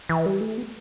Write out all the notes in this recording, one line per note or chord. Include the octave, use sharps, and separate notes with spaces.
E3
G3
A3
B3